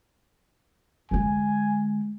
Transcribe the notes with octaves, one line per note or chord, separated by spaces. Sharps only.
D3 G#3 G#5